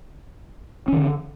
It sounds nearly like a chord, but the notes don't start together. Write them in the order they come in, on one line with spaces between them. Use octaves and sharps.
C#4 D#3 D3